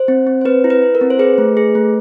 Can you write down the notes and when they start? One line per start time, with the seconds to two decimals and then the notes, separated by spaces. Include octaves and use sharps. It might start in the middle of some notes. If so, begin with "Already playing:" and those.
Already playing: C5
0.08 C4
0.27 C4
0.41 C5
0.45 C4 B4
0.64 E4
0.70 B4
0.82 E4
0.95 A#4
1.01 C4
1.10 C5
1.19 G#4 B4
1.38 A3
1.57 G#4
1.75 A3